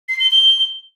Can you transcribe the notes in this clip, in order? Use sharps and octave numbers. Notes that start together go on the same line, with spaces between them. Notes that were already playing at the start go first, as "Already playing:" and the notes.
C7
G7
G7